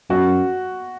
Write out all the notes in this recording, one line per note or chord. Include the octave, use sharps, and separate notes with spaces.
F#2 F#4